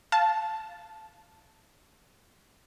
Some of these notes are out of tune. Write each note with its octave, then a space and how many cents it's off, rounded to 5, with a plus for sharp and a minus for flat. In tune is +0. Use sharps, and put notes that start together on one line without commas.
F5 +0 A5 +0